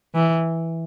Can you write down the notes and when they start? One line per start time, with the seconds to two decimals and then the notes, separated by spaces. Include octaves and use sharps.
0.15 E3